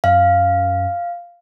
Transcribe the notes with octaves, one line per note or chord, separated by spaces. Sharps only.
F#2 F5